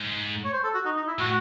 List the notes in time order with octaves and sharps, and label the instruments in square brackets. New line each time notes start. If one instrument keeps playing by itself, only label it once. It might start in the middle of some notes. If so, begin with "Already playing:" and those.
Already playing: [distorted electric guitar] G#2
[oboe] C#5
C5
A4
F#4
D#4
D#4
E4
[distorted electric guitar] A2 [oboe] F#4